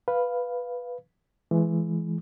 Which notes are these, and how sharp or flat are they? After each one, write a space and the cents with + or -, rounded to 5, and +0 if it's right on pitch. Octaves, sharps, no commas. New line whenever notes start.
B4 +0 F5 +0
E3 +15 G#3 +30